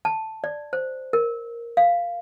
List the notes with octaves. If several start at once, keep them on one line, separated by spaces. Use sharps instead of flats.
A5
D5
C5
A#4
F5